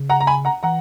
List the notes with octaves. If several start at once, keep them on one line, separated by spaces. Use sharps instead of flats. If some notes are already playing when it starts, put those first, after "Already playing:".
Already playing: C#3
F#5 A#5
A#5
G#5 B5
F#5 A#5
E3 F#5 A#5